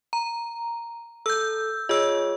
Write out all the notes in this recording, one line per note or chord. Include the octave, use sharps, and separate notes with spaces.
A#5
A4 E6 G6
F4 G#4 C#5 D#5 E6